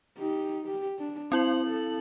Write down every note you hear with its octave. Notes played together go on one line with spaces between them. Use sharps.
D#4 G4
G4
D4
C4 E4 C5 F#7
A4